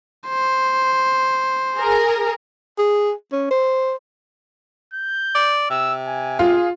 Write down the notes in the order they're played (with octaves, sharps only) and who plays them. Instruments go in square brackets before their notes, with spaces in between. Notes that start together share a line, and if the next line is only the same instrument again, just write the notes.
[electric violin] C5
[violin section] G#4 A#4
[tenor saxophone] G#4
C#4
C5
[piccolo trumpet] G6
[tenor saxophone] D5
[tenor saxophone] C3 [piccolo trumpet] E6
[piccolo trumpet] G#5
[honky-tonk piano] F4 [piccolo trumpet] G#4